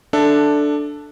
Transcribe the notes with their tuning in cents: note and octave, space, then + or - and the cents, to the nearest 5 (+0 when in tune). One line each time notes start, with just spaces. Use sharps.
D4 +5 A4 +0 E5 +0